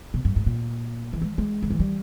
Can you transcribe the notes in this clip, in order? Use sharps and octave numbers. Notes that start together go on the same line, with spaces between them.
B2
G2
G#2
A#2
E3
G#3
G#3
D#3
E3
G3